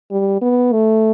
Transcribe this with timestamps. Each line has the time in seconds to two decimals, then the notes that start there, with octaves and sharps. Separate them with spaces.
0.11 G3
0.41 B3
0.72 A3